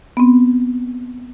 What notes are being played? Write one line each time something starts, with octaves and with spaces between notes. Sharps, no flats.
B3 C4